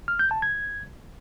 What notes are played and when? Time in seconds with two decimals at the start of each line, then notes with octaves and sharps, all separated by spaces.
0.08 F6
0.19 G6
0.31 A5
0.42 G#6